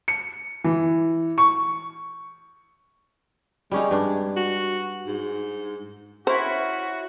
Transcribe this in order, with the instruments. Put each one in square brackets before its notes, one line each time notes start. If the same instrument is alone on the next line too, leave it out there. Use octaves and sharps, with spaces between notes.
[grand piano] C#7
E3
C#6
[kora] G3 C#4 D#4 [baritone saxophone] G#3
[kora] G2 D4
[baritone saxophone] F#4
G#2
[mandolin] C#4 E4 [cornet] F#4 [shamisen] C5